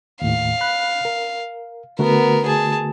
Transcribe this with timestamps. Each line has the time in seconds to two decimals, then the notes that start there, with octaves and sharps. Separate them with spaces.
0.21 D#2 A2 F5
0.61 B5 F#6
1.05 A#4
1.99 D3 A3 B3 F#4 A#4
2.45 G#4 A5